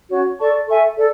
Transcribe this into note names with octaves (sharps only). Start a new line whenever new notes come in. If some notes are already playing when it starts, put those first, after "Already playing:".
C#4 F#4 C#5
A4 D5 A5 C#6
A4 E5 G#5 C#6
A4 D5